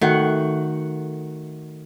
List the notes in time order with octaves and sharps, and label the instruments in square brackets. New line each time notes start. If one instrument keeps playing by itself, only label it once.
[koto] D#3 [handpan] A3 F#4 F#5